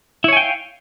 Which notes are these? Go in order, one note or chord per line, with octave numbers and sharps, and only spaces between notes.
E4 C#5 F5 G5 G#5